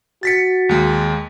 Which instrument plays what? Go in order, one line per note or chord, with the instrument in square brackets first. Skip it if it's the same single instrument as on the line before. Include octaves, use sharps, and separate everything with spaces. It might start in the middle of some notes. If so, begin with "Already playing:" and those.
[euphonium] F#4 [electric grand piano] A6 B6 C#7
[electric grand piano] D#2 G#3